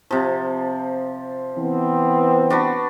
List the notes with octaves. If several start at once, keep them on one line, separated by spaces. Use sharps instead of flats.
C3 F3
E3 B3 C4
D4 F#4 B4